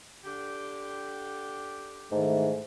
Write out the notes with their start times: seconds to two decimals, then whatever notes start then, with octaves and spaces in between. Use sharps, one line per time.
0.25 D3 G4
2.12 G#2 D#3 E3 A3